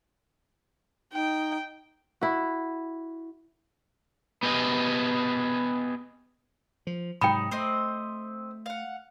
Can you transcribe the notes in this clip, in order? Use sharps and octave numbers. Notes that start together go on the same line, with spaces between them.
D#4 G5
E4 F#4
B3 G4 G#4 D#5
F3
G#2 C3 F#3 D#4 G5 B5
A3 C4 C5 D#5
F5 F#5